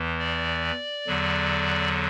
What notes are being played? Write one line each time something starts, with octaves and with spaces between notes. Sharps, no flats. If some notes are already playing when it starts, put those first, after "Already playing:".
Already playing: E2 E3
D5
E2 D3 F#3